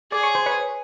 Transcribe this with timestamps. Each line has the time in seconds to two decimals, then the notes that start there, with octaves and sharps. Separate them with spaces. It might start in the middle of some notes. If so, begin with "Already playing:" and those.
0.12 G#4 D5
0.23 C#5
0.35 C5
0.46 B4 C#5